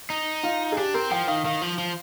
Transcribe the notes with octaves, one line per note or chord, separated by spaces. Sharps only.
D#4
F4
G#4
D4 G4
C4 A#4
F3 G5
D#3 F5
D#3 F5
F3
F3